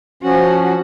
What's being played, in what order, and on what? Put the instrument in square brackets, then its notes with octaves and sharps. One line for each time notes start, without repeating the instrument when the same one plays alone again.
[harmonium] F3 C#4 [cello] F#4